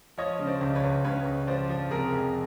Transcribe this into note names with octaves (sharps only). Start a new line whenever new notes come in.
F3 C#5 D#5
C#3
C5 D5
C#2
B4 C#5
C#2
C#3 B4 C#5
C#2
F3 C5 D5
F3
C3 G#4 A#4
F2